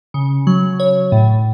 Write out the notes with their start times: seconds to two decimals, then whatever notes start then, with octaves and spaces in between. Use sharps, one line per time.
0.14 C#3
0.47 F#3
0.80 C#5
1.12 A2